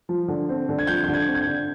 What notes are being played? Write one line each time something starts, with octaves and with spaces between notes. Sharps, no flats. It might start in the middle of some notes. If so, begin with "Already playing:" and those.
F3
D3
C4
D3
G#6
F3 G6
D3 G6
G#6
C4
G#6
G6
D3